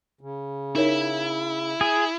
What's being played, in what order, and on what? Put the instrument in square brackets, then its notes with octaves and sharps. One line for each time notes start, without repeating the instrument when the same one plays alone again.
[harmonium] C#3
[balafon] D#4 A#4 C#5 [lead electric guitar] E4
[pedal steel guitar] G#4